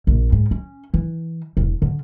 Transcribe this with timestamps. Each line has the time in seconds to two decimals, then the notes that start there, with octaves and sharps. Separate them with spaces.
0.07 A#1
0.32 G#2
0.51 C#4
0.94 E3
1.57 E1
1.82 D3